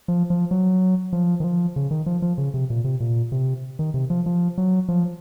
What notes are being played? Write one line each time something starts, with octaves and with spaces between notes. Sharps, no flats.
F3
F3
F#3
F3
D#3
F3
C#3
D#3
F3
F3
C#3
C3
A#2
C3
A#2
C3
D#3
C3
F3
F3
F#3
F3